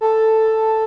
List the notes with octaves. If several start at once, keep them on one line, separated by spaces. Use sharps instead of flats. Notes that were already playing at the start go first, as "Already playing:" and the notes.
A4